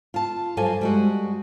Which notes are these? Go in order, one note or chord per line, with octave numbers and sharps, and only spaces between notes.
F4 A5
G2 F#3 F4 A4 C5 G#5
G3 G#3 F#4